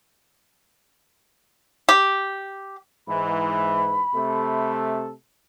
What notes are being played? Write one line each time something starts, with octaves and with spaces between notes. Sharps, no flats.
G4
G#2 E3 B5
C3 A3 A4